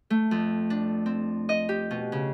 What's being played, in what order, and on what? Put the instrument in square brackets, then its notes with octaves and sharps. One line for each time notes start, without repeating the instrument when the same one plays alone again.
[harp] A3
F2
D4
C4
D#5
G4
B2
C#3